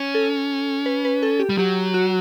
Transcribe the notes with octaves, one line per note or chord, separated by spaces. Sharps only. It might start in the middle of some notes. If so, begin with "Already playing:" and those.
Already playing: C#4
A4
B4
B4
A4
G4
G3
F#3 G4
F#4